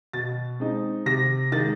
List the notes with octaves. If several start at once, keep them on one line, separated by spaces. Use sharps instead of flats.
B2 A6
G#3 C4 D#4
C3 A#6
D#3 G#3 A6